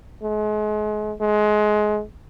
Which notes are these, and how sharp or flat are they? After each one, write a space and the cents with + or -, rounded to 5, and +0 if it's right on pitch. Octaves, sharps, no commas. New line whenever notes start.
G#3 +35
G#3 +25